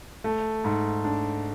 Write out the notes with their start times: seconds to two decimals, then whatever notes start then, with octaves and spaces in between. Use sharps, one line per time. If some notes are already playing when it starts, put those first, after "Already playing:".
0.24 A3
0.64 G#2
1.05 D4